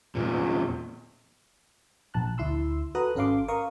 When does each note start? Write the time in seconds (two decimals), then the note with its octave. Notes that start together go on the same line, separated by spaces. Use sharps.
0.15 E2 A#2
2.14 A#1 A5 F#6
2.38 D2 E4 C6 E6
2.95 F#4 A4 B4 A#5 D#6 F#6
3.15 G#1 C#4 A4 F5 C6 D6
3.48 A#4 F5 C#6 D#6